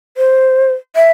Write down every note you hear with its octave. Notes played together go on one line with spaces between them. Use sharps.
C5
E5